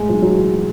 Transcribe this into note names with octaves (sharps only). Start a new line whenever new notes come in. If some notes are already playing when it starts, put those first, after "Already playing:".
Already playing: A2 G#3
B1
F#3
E3